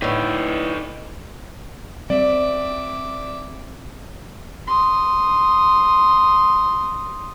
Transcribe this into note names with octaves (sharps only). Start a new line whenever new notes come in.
A2 D3 D#4 B4
G3 C4 D5 E5 D6
C6 D#6